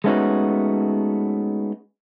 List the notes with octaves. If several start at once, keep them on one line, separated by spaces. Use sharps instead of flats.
G#3 A3 B3 C#4 D#4 F#4